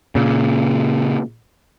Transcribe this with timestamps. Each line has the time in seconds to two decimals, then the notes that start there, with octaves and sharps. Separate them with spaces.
0.15 A#2 C#3